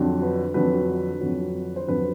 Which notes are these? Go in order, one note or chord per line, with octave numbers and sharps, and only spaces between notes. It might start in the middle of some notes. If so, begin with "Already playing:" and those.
Already playing: F2 D3 F#3
B4
F2 D3 F#3 B4
F2 D3 F#3
C5
F2 D3 F#3 B4